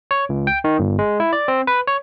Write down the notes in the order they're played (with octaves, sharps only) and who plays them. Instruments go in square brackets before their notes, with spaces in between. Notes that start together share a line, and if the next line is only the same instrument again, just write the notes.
[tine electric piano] C#5
C#2
G5
D#3
G1
G#3
E4
D5
C4
B4
C#5